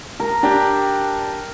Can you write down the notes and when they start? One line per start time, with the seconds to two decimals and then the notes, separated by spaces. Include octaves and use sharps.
0.20 A#4
0.43 D4 G4 G5